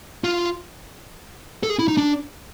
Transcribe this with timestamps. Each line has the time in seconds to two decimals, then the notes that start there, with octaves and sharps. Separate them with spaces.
0.24 F4
1.63 A4
1.70 G#4
1.79 E4
1.88 D#4
1.97 D4